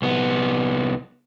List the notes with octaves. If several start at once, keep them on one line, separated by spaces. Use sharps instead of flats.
C2 B3